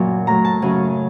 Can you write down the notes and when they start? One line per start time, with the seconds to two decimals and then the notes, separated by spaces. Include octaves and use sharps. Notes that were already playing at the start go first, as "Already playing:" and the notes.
Already playing: F#2 A#2 C#3 F#3
0.27 A2 F#3 A#5
0.45 A5
0.62 F#2 C#3 F#3